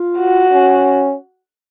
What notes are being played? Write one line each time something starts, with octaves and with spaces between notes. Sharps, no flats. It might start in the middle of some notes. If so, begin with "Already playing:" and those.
Already playing: F4
F#4
C#4